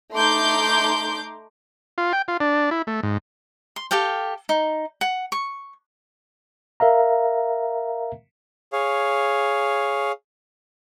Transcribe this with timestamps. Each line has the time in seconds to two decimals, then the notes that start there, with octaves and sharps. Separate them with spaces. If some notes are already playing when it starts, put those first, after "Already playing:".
0.14 A3 D#4 A#5 C6 D6 G6
1.98 F4
2.13 G5
2.28 F4
2.40 D4
2.71 E4
2.87 A3
3.03 G#2
3.76 C6
3.91 G4 A4 F5 G5
4.49 D#4
5.01 F#5
5.32 C#6
6.80 A#4 E5 F5 A#5
8.73 G#4 C#5 F5